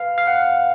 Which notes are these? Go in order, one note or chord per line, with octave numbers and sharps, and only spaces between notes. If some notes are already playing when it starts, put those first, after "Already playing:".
Already playing: B4 F5
F5
F#5